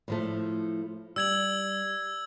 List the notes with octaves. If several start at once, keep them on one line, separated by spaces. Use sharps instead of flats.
A2 F3 A3
G3 E6 G#6 F#7